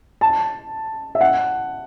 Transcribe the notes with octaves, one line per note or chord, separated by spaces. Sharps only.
A5
E5
F#5